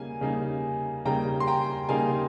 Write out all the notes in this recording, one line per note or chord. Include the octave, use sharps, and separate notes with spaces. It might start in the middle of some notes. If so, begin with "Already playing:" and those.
Already playing: C#3 G3 A#3 D#4 G#5
C#3 G3 A#3 D#4
C#3 G3 A#3 D#4 G5 A#5
C6
G5 A#5
C#3 G3 A#3 D#4 F5 G#5